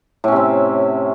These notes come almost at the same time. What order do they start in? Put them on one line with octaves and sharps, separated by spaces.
A2 C#4 C3 C4